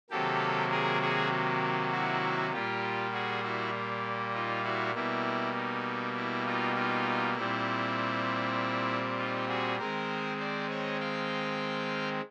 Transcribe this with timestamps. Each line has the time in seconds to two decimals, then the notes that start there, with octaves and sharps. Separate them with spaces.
0.10 C3 D#3 F#3 A#3 G4 A4
0.71 G#4 A#4
1.01 F#4 G#4
1.92 E4 F#4
2.53 A#2 G3 A#3 F4 G4
3.13 F#4 G#4
3.43 E4 F#4
4.34 D#4 F4
4.64 E4 F#4
4.95 B2 G3 A#3 E4
5.56 D#4
6.16 E4
6.46 D#4 F4
6.76 D#4 F4
7.36 A#2 G3 C4 E4
9.18 D#4 F4
9.48 F#4 G#4
9.79 D#3 G#3 C4 A#4 C5
10.39 C5 D5
10.69 C#5 D#5
11.00 F5 G5